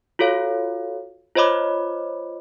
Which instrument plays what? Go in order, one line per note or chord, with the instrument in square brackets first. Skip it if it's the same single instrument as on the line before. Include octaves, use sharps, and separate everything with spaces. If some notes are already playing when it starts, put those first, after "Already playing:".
[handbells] F4 F#4 A4 C#5 F5
F4 C5 C#5 D#5 B5 D6